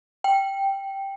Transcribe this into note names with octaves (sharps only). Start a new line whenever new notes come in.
G5